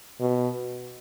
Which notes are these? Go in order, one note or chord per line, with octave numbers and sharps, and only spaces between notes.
B2